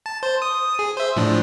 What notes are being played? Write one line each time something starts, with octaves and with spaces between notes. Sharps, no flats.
A5
C5
D#6
G#4
C5 E5
A2 F3 D4